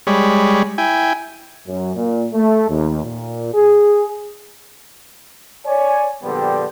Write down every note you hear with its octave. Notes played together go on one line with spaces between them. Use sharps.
G3 G#3 C#5 B5
E4 G5 G#5
F#2
A#2
A3
D#2
A#2
G#4
C#5 D5 G#5
A#1 D3 G3 B3 C5 G5